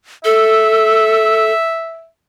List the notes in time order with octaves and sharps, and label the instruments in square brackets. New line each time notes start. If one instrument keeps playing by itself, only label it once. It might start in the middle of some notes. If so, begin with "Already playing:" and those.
[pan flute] A4 [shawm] E5